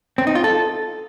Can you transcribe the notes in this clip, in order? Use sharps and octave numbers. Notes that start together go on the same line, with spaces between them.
C4
D#4
F4
A4